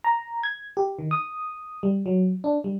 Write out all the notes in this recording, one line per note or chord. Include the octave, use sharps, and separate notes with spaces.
A#5
G#6
G4
D#3
D#6
G3
F#3
D4
G3